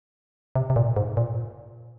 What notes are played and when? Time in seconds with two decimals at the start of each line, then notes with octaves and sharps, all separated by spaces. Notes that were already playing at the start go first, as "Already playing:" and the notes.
0.55 C3
0.70 C3
0.76 A#2
0.96 G#2
1.17 A#2